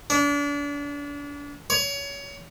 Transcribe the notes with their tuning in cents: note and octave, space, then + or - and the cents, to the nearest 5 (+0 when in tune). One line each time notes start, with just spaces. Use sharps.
D4 -35
C#5 +25